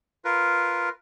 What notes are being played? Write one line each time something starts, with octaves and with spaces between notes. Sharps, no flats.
F4 A#4 B4